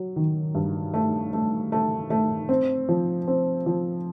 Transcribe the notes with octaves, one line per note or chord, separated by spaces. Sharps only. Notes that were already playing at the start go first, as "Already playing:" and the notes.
Already playing: F#3
D#3
G2
A3
A3
A3
A3
C4
F3
C4
F3